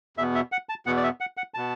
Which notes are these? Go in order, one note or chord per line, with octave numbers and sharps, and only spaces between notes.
E2 B2 B3 E5
E5
F#5
A5
E2 B2 B3 F#5
D5
E5
F#5
F#5
B2 B3 A5